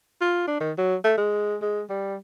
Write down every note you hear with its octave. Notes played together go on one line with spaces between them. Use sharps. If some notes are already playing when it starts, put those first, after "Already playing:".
F4
D4
D#3
F#3
A3
G#3
G#3
G3